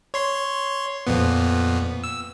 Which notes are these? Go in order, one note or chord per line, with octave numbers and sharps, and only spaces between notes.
C#5 C6
F2 A#2 B3
E6